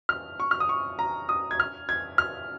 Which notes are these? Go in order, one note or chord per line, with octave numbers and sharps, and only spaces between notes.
F6
C#6
F6
D#6
C#6
A#5
D#6
G#6
F6
G#6
F6